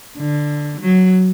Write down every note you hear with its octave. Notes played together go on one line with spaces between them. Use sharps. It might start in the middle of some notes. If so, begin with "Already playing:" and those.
D3
F#3